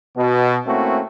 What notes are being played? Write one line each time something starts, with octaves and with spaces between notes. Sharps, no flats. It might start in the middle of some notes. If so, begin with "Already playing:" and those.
B2
A3 A#3 C4 C#4 E4 F#4